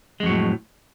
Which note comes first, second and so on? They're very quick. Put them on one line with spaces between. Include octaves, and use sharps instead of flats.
G#3 F2 F#3 A2